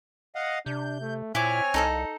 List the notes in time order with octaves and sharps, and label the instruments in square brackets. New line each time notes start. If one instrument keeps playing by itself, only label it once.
[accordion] D#5 F5 F#5
[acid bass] C3 [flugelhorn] D4 [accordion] G6
[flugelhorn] A3
[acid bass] A#2 [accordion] C4 C#5 F6 [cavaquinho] E4 D6 [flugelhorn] G#5
[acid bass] C2 [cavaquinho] D#4 A4 D#5